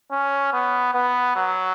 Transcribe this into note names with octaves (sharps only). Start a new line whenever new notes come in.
C#4
B3
B3
F#3